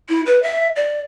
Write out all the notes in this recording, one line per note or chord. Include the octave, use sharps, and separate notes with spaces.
E4
B4
E5
D5